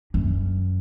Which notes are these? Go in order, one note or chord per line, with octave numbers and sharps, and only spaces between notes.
F#2